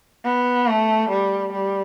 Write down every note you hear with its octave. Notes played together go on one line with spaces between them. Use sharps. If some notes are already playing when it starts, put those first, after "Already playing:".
B3
A3
G3
G3